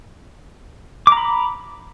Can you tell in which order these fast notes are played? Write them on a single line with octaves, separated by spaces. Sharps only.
D6 A#5 B5